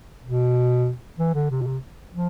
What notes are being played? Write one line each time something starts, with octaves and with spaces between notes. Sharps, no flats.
B2
E3
D3
C3
B2
C3
F3